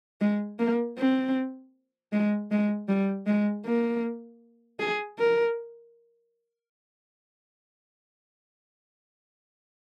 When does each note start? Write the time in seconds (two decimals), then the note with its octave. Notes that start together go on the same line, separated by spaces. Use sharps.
0.21 G#3
0.59 A#3
0.98 C4
2.13 G#3
2.51 G#3
2.88 G3
3.27 G#3
3.66 A#3
4.79 G#4
5.18 A#4